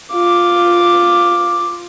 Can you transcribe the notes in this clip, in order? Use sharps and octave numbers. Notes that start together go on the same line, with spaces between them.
F4 D6